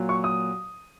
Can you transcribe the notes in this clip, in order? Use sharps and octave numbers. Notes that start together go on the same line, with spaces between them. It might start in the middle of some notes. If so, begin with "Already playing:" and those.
Already playing: A#2 F#3
C#6
D#6